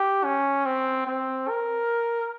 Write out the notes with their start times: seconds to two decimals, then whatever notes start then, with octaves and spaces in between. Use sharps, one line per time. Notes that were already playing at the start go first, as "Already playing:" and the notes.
Already playing: G4
0.24 C#4
0.66 C4
1.07 C4
1.49 A#4